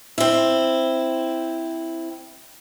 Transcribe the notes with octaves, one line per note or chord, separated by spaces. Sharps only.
C4 E4